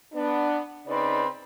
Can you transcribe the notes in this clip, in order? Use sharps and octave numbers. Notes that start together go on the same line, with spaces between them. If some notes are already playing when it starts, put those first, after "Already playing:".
B3 D4
C#3 C4 D#4 B4 D5